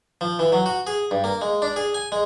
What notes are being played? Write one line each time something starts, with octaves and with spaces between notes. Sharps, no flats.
F3
E3
F#3
F#4
G#4
G2
A#3
G#3
D4
G#4
G#5
G#3